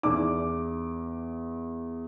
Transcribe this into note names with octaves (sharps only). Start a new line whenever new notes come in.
E2 D#4 D5 D6